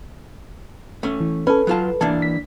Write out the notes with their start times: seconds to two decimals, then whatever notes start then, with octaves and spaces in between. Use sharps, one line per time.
1.03 A3 C#4
1.21 E3
1.47 C#4 A4 B4
1.67 F#3 F4 A5
2.01 E3 A#3 D4 A5
2.22 B6